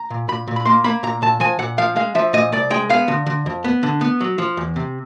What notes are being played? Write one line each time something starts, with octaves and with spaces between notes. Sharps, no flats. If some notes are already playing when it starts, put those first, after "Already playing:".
Already playing: A#5
A#2
A#2 B5
A#2
B5
A#3 C6
A#3 B5
A#2 A#5
A#2 A5
F3 G#5
A#2 F#5
F3 F5
G#3 F5
F3 E5
A#2 D#5
C2 D5
G#3 G5
B3 F5
D3
D3
F2
B3
D3
B3
F#3
F3
E2
C3